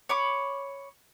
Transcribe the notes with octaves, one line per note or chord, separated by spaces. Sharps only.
C#5 B5 D6